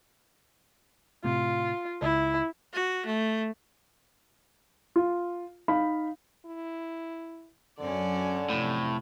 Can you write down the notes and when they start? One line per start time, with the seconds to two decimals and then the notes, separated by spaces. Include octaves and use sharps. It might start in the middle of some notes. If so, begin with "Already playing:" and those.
1.24 A2 C3 F4
2.02 C#2 E4
2.73 F#4
3.06 A3
4.96 F4
5.68 D#4 F5 B5
6.46 E4
7.79 F#2 D3 C#4 D5
8.50 F2 A2 C3